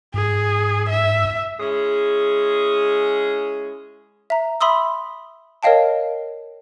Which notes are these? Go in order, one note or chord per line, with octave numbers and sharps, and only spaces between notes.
G#2 G#4
E5
G#3 C#4 E4 G#4
E5 A#5
E5 B5 C6 D#6 E6
A#4 C#5 D#5 F5 G5 A5